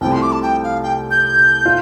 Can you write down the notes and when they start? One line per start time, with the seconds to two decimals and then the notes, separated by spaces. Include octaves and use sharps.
0.01 C2 C3 F3 A3 G5
0.12 C6
0.22 D6
0.32 A5
0.42 G5
0.63 F5
0.83 G5
1.11 G6
1.65 F4